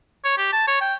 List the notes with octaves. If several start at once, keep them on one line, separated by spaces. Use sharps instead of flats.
C#5
G4
A5
C#5
G5